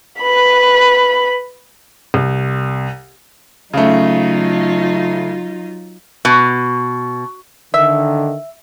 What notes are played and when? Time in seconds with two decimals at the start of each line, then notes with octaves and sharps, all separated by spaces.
0.22 B4 B5
2.14 C2
3.74 C#3 F#3 A3 D#4 F4
6.25 B2
7.74 D3 D#3 E5